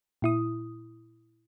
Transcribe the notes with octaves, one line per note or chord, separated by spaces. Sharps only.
A#2 E4 D#6